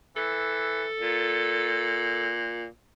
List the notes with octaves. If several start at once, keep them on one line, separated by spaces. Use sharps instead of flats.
E3 A4
A#2